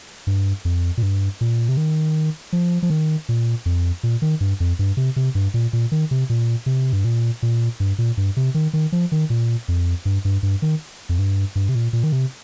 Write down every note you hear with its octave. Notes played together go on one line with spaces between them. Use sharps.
G2
F2
A#2
G2
A#2
C3
D#3
F3
F3
D#3
A#2
F2
A#2
D#3
G2
F2
G2
C3
C3
G2
A#2
A#2
D#3
C3
A#2
C3
G2
A#2
A#2
G2
A#2
G2
C3
D#3
D#3
F3
D#3
A#2
F2
G2
G2
G2
D#3
F2
G2
G2
C3
A#2
A#2
D#3
C3